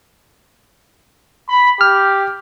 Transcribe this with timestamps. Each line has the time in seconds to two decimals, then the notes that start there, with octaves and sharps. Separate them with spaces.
1.49 B5
1.81 G4 F6